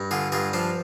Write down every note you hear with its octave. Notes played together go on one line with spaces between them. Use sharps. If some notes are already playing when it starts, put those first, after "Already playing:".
Already playing: G2
D3 F4 G#4
G2 F4 G#4
F3 D4 F4